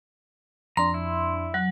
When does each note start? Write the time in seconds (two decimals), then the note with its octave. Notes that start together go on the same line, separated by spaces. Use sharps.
0.77 F2 D4 A#5 C6
0.94 E4
1.54 F#3 F#6